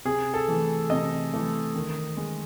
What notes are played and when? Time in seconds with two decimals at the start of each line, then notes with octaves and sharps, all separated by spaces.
0.05 C3 G#4
0.34 A4
0.48 E3 A3
0.90 C3 D#5
1.33 E3 A3
1.75 D#3
2.17 G#3